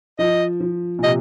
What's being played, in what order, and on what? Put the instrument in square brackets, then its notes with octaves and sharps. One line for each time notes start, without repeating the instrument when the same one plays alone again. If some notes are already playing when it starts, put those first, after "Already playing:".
[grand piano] F3 [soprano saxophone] D#5
[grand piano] F3
A#2
[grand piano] C3 [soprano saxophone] D#5